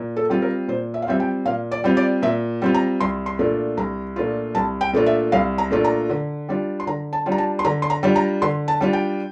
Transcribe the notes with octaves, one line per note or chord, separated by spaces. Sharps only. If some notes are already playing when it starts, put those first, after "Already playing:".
Already playing: A#2
A4
G3 C4 F4
A#4
A#2 C5
E5
F5
G3 C4 F4 E5
G5
A#2 F5
D5
G3 C4 F4
D5
A#2 E5
G3 C4 F4
A#5
C2 C6
C6
A#2 A3 D4 F4
C2 A#5
A#2 A3 D4 F4
C2 A5
G5
A#2 A3 D4 F4
E5
C2 F5
A#5
A#2 A3 D4 F4
A#5
D3
G3 D4 F4
C6
D3 A#5
A5
G3 D4 F4
A#5
A5
C6
D3 A#5
C6
A#5
G3 D4 F4
A#5
D3 C6
A5
G3 D4 F4
G5